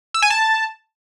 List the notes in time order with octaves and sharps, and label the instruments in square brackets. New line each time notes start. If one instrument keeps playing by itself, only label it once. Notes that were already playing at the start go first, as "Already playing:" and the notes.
[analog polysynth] E6
G#5
A5